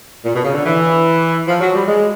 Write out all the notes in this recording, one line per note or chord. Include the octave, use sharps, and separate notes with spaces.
A#2
B2
C#3
D3
E3
F3
F#3
G3
G#3